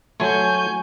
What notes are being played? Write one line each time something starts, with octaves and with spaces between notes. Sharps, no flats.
F#3 A3 C#5 G#5 G6